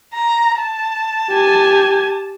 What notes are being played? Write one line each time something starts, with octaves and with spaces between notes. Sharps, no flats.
A#5
A5
G4 G#5